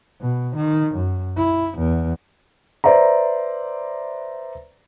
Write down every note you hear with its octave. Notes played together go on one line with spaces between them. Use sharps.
B2
D#3
F#2
E4
E2
B4 C5 D5 E5 A#5